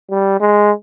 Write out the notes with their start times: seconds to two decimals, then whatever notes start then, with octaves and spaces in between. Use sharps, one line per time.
0.10 G3
0.40 G#3